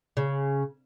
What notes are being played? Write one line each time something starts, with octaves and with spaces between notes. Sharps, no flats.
C#3